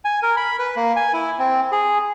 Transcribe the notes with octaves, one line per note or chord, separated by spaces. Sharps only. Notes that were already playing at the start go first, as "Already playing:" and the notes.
G#5
A#4
B5
B4
A#3
G#5
E4
C4
G#4